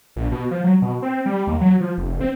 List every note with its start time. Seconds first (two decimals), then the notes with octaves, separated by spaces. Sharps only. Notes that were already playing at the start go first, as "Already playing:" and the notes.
0.16 A#1
0.32 B2
0.51 F3
0.64 F#3
0.82 B2
1.02 C4
1.26 G3
1.47 D#2
1.61 F#3
1.81 F3
1.98 F1
2.21 C4